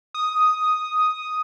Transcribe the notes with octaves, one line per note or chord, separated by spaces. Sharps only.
D#6